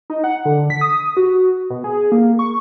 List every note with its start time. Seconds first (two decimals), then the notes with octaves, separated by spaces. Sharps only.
0.10 D#4
0.24 F#5
0.45 D3
0.70 B6
0.81 D#6
1.17 F#4
1.70 B2
1.84 G#4
2.12 A#3
2.39 C#6